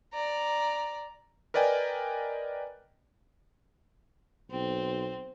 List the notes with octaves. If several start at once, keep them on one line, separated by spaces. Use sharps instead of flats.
D5 A#5
A#4 B4 D5 D#5 G5 G#5
B1 C4